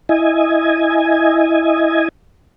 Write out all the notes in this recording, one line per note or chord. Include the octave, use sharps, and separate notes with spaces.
E4 D#5 G#5